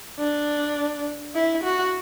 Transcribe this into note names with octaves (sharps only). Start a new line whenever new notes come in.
D4
E4
F#4